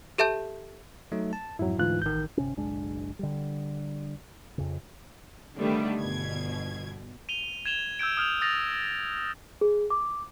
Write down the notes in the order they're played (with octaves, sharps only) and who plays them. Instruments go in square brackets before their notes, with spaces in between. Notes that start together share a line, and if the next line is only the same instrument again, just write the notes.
[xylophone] G4 A4 E5 A5 G6
[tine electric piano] F#3 A3 D#4
A5
[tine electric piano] F2 G#2 [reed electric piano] F#3 E4
[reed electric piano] D2 F4 F#6 [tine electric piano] G#2 E3
[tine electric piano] A1 D#3 [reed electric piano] G6
[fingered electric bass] G1 C3 C#4
F#1 B1 G#3 D4
D3 G3
F2 C#3
[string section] D3 D#3 G3 A3 B3
G1 B2 G#6
[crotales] D#7 F7 G7
G#6 E7 F7 G7
E6 G6 G#6 D7
D#6 F6 G6 F7
D#6 A6 A#6 F7
[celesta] G#4
D6